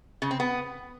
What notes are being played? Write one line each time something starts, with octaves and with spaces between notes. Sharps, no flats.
C#3
C4
B3